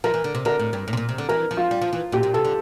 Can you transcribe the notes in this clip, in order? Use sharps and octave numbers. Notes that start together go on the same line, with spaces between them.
F3 A#4
E3
D3
C3
D3 A#4
A2
G2
A2
C3
A#2
C3
D3
E3 A#4
F3
F4
G3
F3
E3
A#2 G4
A#2
C3 A4
D3